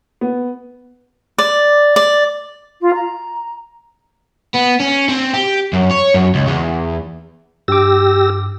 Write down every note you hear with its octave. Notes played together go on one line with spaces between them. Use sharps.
B3
D5
D5
F4
A#5
B3
C#4
C4
G4
F#2
C#5
F#2
C#2
E2
G2 G4 D6 E6 A#6